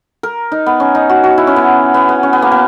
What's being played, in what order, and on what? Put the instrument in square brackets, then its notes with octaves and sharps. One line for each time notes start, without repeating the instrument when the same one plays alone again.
[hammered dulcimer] A#4
D#4
B3
C#4
D#4
F#4
F#4
E4
C#4
B3
B3
B3
C#4
B3
A#3
B3